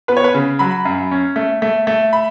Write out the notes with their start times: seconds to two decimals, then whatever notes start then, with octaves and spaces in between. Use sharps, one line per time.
0.08 B3 B4
0.17 C#5
0.24 B4
0.34 C#3
0.59 F#3 B5
0.85 F#2
1.11 C#4
1.36 A3
1.62 A3
1.87 A3
2.13 B5